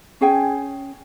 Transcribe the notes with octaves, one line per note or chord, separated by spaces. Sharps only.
C#4 G#4 G5 G#5